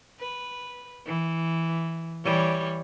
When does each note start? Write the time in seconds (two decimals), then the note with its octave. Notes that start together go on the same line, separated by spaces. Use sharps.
0.20 B4
1.06 E3
2.24 E3 G3 C#5